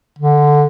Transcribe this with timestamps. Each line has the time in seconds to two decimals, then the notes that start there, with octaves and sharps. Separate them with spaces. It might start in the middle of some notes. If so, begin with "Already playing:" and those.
0.19 D3